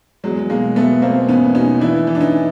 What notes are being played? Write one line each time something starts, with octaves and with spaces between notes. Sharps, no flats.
E2 F#3 G#3
B2 G#3 A#3
B2 A3 B3
B2 A#3 C4
E2 B3 C#4
B2 C#4 D#4
E3 D4 E4
E3
D4
C#4 D#4